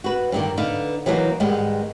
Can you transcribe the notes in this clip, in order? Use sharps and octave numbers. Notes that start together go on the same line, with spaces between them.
F#4 B4
G2 D3 D#3
D3 D#4 B4 F5
E3 F#3 G3 A#3 B3 D#4
G#2 D#3 G3 G#3 B3